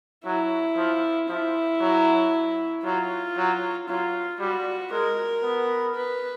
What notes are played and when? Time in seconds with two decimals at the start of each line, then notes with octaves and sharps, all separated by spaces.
0.25 F#3 E4
0.77 F3
1.29 F3 E4
1.81 F#3
2.84 F#3 F4
3.36 F#3
3.88 F#3 F4
4.39 G3 F#4
4.91 G#3 A#4
5.43 B3
5.95 B4